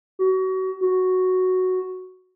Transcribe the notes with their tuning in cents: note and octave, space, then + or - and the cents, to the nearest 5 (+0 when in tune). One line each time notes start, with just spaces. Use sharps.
F#4 +30
F#4 +0